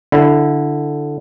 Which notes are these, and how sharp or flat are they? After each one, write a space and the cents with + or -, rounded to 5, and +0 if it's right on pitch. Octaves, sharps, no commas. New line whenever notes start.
D3 +0 E4 +5